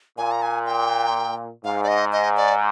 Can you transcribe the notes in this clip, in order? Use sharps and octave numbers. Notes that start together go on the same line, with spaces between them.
A#2 G#5
A#5
G#5
G5
G#2 F5
D5
D#5
D#5
D5